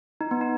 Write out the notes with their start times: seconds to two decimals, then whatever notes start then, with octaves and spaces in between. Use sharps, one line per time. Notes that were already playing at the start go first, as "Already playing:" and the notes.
0.21 D#4
0.31 B3
0.41 D#4